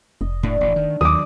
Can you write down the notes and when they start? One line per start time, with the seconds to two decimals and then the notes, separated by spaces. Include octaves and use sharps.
0.21 F1 D#5
0.43 A2 D3 A3
0.61 A1
0.76 D#3
1.01 D#2 D#3 F#3 D5 D6 D#6